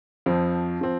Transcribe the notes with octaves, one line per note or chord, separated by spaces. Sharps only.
F2 F3 C4
F3 C4